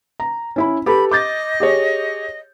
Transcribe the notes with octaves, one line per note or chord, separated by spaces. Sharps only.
A#5
C#4 E4 B5
G4 A4 B4 B5
D#5 D6 G6 A6
G4 G#4 C#5